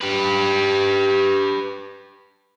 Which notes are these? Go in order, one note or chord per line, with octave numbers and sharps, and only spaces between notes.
G4 B4